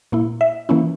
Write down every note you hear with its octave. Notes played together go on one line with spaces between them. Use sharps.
A#2 A#3 E4
E5
E3 A#3 C#4 E4